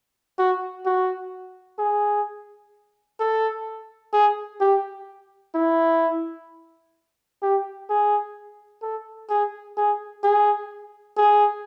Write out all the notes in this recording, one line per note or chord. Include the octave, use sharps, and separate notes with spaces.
F#4
F#4
G#4
A4
G#4
G4
E4
G4
G#4
A4
G#4
G#4
G#4
G#4